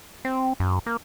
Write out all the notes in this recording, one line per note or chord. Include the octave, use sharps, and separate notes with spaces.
C4
F#2
A#3